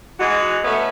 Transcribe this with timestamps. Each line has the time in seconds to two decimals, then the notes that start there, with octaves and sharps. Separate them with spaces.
0.18 E3 G#3 D#4 F#4
0.63 A3 B3 C#4 B4 E5